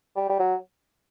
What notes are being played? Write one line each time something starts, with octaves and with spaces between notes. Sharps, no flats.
G3
G3
F#3